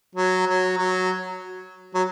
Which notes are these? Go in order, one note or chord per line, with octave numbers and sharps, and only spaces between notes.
F#3
F#3
F#3
F#3